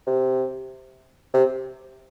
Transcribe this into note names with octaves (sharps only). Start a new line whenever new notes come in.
C3
C3